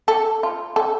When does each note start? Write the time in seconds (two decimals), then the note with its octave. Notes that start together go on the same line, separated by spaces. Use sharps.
0.08 A4
0.43 F4
0.76 A4